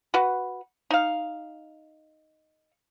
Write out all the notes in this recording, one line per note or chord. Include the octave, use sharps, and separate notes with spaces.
F#4 B4
D#4 F5